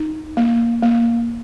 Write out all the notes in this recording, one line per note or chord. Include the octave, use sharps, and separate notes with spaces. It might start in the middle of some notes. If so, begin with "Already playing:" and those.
Already playing: D#4
A#3
A#3